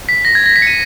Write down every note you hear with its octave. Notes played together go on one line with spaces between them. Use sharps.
B6
A#6
G#6
A#6
B6
C#7
D#7